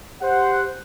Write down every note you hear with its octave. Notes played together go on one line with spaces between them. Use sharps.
G4 C5 F#5